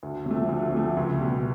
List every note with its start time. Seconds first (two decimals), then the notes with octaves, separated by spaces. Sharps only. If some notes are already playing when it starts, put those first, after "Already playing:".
0.03 D2
0.26 C3 F3 A3
0.49 D2
0.73 C3 F3 A3
0.97 C#2
1.20 B2 G3